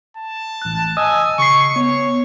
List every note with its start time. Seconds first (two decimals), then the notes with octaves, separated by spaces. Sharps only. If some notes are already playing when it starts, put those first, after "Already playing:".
0.17 A5
0.62 A1 F#6
0.97 D#5 G#5 D#6 E6
1.39 C#3 C#6 C7
1.76 B3 C#5